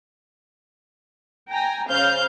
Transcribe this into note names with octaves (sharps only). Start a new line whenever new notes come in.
G5 G#5 A#5
C#3 C5 F5 G6